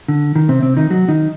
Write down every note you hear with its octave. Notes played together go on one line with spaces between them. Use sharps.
D3
D#3
C3 C4
C3 C4
D#3 D#4
F#3 F#4
D#3 D#4